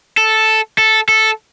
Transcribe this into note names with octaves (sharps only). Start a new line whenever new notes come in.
A4
A4
A4